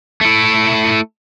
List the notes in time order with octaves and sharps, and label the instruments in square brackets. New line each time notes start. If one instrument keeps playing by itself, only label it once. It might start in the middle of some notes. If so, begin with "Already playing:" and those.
[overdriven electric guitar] A3 E4